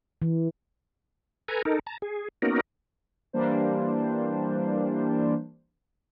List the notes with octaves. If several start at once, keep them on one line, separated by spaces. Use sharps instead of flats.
E3
A4 B4 G#5 A#5
D#4 A4 A#4
A5 A#5
G#4
A#3 B3 C#4 D#4 F#4 A#4
E3 G3 A#3 D4 C5